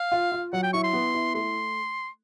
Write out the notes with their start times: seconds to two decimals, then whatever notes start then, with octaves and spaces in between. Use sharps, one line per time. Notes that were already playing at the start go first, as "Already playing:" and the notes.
Already playing: F5
0.12 F4
0.32 F4
0.53 F#3 F#5
0.63 G5
0.73 E4 C#6
0.84 C6
0.93 B3
1.14 E4
1.35 A3 C6